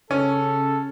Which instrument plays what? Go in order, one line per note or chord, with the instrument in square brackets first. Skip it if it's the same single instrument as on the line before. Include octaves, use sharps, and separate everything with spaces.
[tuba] C#3 [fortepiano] C#4 [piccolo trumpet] A4